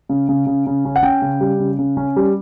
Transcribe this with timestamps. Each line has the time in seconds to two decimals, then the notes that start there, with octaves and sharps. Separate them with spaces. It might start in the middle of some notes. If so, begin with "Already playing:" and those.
0.09 C#3
0.29 C#3
0.47 C#3
0.66 C#3
0.85 C#4
0.96 F#5
1.03 C#4 G5
1.22 C#3
1.41 G3
1.59 C#3
1.79 C#3
1.97 C#4
2.16 G3